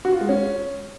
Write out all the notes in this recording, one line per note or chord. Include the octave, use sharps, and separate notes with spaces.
F#4
F4
G#3
C#4